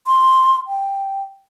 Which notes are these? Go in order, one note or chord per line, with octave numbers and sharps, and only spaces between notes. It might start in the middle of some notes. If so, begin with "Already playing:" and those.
C6
G5